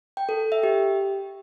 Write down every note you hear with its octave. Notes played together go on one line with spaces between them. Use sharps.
G5
A4
G5
E5
G4